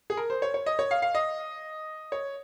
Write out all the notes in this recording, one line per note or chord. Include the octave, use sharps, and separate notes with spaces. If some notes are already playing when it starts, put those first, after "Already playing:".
G#4
A#4
C5
C#5
C#5
D#5
C#5
F5
F5
D#5
C#5